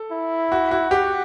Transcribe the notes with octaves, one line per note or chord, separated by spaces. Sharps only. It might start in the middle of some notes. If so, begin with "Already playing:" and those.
Already playing: A4
E4
F#4
F#4
F#4 G4